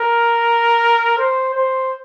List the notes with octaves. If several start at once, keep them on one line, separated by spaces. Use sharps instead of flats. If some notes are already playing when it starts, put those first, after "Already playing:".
Already playing: A#4
C5
C5